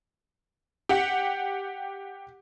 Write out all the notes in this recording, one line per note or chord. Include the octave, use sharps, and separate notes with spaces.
G4 F#5